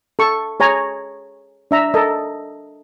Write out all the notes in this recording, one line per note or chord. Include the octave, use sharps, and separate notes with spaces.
A4 C#6
G#4 C#5 G#5 A#5
D4 E5 A#5
A4 A#4 D#5